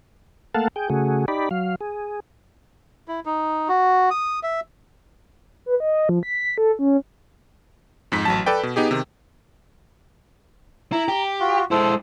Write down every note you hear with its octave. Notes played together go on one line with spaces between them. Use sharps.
A3 A#3 A4 F5 F#5 A5
G#4 G5
C#3 A3 F#4 G#4
D#4 G4 D5 B5
F#3 F5
G#4
E4
D#4
F#4
D#6
E5
B4
D#5
F3
B6
A4
C#4
F2 G#2 B6
A1 F#3 A5
A4 B4 D5 G5
B2
B3 D#4 G4 G#4
C3 D#3
E4 A#5
G4
F4 F#4
G#3 E4 A4 C5